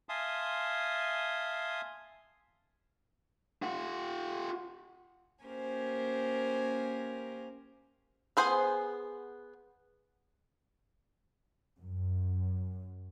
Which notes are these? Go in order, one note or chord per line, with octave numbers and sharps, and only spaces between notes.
E5 F5 G#5 A5 C6 D#6
F4 F#5
A#3 C#4 G4 A#4 C5 G#5
B3 G#4 C5 F#5 G#5
F#2